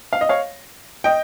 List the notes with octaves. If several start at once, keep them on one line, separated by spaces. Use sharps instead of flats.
F5
D#5
C#5 F5
D#5 G5